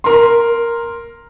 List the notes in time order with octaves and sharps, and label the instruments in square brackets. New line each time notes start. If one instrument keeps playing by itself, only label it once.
[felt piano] A#4 C6